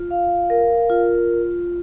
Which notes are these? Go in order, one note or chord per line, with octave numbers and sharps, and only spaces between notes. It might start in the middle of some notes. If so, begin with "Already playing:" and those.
Already playing: F4
F5
A#4
F4